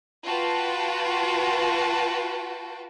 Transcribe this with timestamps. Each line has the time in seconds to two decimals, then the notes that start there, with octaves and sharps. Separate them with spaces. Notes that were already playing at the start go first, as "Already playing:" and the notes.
0.26 F4 F#4 B4 G5 A5